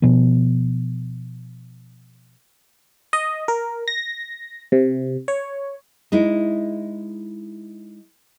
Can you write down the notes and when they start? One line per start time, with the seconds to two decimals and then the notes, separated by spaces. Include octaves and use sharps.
0.02 B2 F3 B3
3.13 D#5
3.48 A#4
3.88 A#6
4.72 C3
5.28 C#5
6.12 G#3 D#4 E4